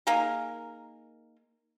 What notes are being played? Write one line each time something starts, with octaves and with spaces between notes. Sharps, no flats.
A#3 D#4 G#4 A#4